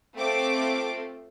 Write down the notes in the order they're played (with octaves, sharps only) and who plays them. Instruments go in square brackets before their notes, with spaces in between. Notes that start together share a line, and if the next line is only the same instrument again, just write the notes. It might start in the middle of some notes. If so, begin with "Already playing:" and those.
[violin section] A3 C4 F4 A4 D6